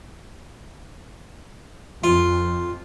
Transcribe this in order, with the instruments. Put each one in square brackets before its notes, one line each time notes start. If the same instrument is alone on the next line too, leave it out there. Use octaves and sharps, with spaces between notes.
[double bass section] F2 [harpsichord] F4